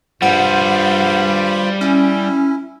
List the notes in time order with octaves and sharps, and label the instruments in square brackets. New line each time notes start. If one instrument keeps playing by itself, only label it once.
[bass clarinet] G2 [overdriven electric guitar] G3 G#4 [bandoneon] F4 C5 B5 [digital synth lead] F#5
[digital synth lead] C#4 [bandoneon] E4